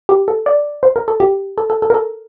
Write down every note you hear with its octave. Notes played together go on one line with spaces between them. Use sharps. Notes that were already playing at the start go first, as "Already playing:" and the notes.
G4
A4
D5
C5
A#4
A4
G4
A4
A4
A4
A#4
A4